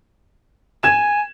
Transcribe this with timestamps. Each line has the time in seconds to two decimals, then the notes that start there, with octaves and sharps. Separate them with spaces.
0.83 G#5 G#6 E7